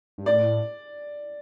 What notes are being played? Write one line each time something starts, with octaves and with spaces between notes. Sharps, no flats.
G2
A2 D5